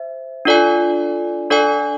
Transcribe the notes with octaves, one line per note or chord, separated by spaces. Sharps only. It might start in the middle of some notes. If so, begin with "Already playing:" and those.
Already playing: C5 E5
D4 F4 A4 D5 G#5
D4 A4 D5 G#5